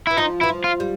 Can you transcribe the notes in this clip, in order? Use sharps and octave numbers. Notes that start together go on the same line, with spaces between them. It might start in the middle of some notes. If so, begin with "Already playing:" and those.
E3 E4
F3 D#4
E3 E4
F3
F4
G3